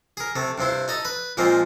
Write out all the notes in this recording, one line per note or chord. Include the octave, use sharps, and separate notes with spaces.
G#4 A#4
C3 A3
G2 C3 C4 E4
D#4 A4 D#5
B4
A#2 F3 G#3 A#3 C4